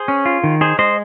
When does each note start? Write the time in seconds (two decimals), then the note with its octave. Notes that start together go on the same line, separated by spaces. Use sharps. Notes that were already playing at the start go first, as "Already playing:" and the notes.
Already playing: G#4 C5
0.08 C#4
0.26 F4
0.44 D#3
0.61 D#4 G#4 C5
0.79 G#3 C5 D#5